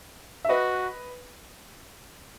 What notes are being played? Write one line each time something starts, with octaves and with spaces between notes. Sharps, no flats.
E5
F#4 B4 D#5